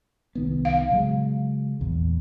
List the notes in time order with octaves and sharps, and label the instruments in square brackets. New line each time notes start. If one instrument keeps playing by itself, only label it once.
[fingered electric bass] C2 D#3 B3
[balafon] F5
[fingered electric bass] C#3 F#3 G#3
A#1 E2